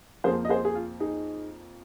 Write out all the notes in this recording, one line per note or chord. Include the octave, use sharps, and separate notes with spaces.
F2 F3 A#3 G#4 C5
D#5
G#4 C5
G#4
F4
D#4 G#4